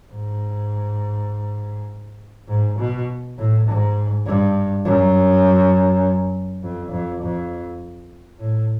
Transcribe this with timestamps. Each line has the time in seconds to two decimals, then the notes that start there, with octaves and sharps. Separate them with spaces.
0.12 G#2
2.48 G#2
2.79 B2
3.37 A2
3.67 G#2
4.26 G2
4.85 F#2
6.63 F2
6.91 F2
7.22 F2
8.39 A2